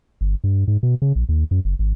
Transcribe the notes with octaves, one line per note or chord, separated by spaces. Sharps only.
G1
G2
G#2
B2
C#3
A#1
D#2
F#2
F#1
G#1